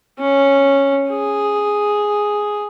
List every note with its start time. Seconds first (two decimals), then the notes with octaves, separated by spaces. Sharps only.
0.19 C#4
1.10 G#4